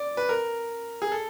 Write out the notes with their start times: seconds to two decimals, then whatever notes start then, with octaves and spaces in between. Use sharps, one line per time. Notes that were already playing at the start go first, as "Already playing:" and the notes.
Already playing: D5
0.17 B4
0.29 A#4
1.02 G#4
1.12 A4